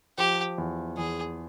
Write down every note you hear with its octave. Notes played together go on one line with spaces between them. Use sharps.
F3 G4
E2
E2 G#4